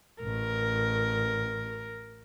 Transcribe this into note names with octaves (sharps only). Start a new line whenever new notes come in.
A1 A#4